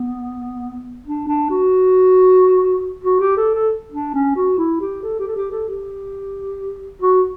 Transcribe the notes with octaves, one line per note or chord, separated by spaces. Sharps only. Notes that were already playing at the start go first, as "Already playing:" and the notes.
Already playing: B3
D4
D4
F#4
F#4
G4
A4
A4
D4
C#4
F#4
E4
G4
A4
G4
A4
G4
A4
G4
F#4